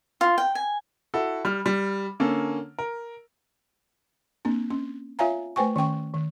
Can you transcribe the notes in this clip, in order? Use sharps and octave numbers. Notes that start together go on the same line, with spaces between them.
F4
G5
G#5
E4 F#4 A4
G3 F6
G3
D3 A#3 C#4 A4
A#4
A#3 C4 D4
C#4
F4 C#5 E5 F5 G#5 A#5
A3 B4 C5 G5 G#5 C#6
D#3 C#4 G5 C#6
D#3